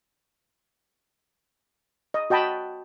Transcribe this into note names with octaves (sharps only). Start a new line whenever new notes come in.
D#5
F#4 D#5 G5 A5 B5